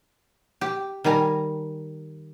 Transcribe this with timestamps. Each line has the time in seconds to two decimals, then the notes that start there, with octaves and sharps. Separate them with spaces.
0.61 G4
1.04 D#3 G3 G#5 A#5